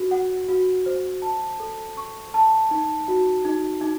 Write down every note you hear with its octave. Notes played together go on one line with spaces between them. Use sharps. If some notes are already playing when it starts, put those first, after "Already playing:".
Already playing: F#4
F#5
F#4
C5
A5
A4
C#6
A5
D#4
F#4
D#4
D#4